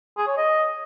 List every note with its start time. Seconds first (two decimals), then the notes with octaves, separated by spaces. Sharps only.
0.18 G#4
0.27 C#5
0.37 D#5